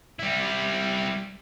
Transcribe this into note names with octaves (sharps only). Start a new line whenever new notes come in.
G3 E4